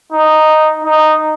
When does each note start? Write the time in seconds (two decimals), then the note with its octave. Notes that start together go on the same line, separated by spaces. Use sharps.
0.12 D#4
0.85 D#4